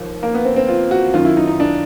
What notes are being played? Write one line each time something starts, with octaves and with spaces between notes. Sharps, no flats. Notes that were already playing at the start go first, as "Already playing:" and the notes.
Already playing: D#2 F3
A#3
B3
C4
C4
F4
F#4
F#2 D#3 F#3 F4
E4
D#4
D#4
D4